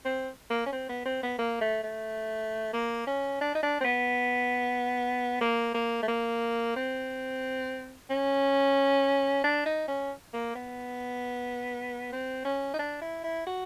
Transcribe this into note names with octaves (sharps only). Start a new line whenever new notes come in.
C4
A#3
C#4
C4
B3
C4
B3
A#3
A3
A3
A#3
C#4
D4
D#4
D4
C4
B3
A#3
A#3
A3
A#3
C4
C#4
D4
D#4
C#4
A#3
B3
C4
C#4
D#4
D4
E4
E4
F#4